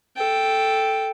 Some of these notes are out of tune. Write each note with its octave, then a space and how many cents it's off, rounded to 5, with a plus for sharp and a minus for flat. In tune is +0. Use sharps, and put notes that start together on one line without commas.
A4 +0 G5 +0